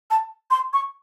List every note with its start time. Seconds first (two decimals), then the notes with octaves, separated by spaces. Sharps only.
0.11 A5
0.51 C6
0.73 C#6